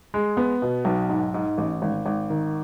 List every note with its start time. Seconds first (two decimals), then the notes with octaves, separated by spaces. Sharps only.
0.14 G#3
0.37 B3
0.62 B2
0.85 B1
1.09 G#2
1.34 G#2
1.58 A1
1.82 G#1
2.06 G#1
2.30 D#3